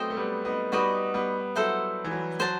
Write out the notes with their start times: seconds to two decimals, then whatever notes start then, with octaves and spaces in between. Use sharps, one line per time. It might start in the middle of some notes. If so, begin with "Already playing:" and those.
Already playing: F#3 A3 B3 C4 C5 D#5 G5
0.10 A3
0.17 G3 B3
0.45 B3 D#4
0.72 G3 B3 D#4 F#4 B4 D#5
1.14 G3 B3
1.56 F#3 E4 A4 C5 F#5
2.05 E3
2.11 F#3
2.39 F#3 C5 F#5 A5